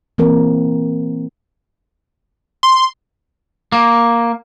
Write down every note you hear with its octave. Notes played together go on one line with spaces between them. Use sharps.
E3 A#3 C4 A#4
C6
A#3